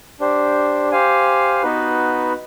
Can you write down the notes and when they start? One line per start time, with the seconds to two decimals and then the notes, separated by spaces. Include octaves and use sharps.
0.20 D4 G4 C5
0.91 G4 C5 F5 G#5
1.62 B3 D#4 F#4 B4